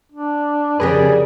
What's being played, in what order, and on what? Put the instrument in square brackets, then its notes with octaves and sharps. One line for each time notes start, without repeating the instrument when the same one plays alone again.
[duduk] D4
[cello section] F2 C#3 D5 [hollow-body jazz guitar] G4 A#4 B4 [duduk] G#4